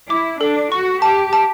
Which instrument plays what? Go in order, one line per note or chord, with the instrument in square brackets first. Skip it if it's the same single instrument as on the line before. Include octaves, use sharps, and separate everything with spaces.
[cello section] E4 [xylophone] D6
[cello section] D4 [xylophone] A4
[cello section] F#4 [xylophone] C#6
[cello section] G4 [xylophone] A5
[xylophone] A5